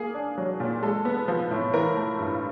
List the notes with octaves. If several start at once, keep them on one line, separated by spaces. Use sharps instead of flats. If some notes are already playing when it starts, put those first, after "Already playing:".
Already playing: A#3 G#4
D4
F#3
A#2
G#3 A4
B3
F3
A2
E3 A#4
A3
G2